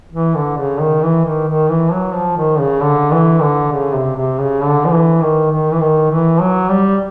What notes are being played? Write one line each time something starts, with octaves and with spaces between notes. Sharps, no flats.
E3
D3
C#3
D#3
E3
D#3
D#3
E3
F#3
F3
D#3
C#3
D3
E3
D3
C#3
C3
C3
C#3
D3
F3
E3
D#3
D#3
E3
D#3
E3
F#3
G3